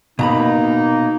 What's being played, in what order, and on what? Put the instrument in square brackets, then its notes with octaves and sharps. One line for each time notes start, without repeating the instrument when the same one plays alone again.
[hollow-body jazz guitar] B2 A#5 B5 [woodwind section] A#3 D#4